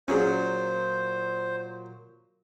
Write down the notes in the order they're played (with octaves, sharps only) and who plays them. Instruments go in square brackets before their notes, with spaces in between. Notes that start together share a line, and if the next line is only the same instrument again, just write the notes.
[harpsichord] A#2 F#3 [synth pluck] C#4 G#4 [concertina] C5